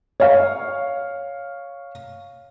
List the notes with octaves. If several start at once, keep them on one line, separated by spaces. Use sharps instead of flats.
C#5 F5